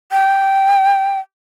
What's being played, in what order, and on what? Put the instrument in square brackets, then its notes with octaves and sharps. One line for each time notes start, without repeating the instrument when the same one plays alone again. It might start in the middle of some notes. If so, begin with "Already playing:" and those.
[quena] G5